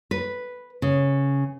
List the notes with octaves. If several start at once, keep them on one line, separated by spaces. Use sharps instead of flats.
B4
C#3